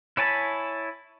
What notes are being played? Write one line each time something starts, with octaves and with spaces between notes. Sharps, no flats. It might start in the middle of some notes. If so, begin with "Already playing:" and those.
E4 C#5 G#5 A5 B5